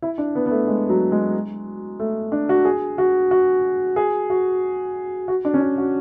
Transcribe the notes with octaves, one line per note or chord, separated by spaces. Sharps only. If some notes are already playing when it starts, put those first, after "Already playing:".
E4
D4
B3
B3
A3
G#3
F#3
G#3
A3
D4
F#4
G#4
F#4
F#4
G#4
F#4
F#4
D4
C#4
D4
F#4